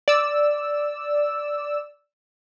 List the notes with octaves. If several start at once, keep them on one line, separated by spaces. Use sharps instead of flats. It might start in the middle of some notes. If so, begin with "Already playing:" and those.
D5 E6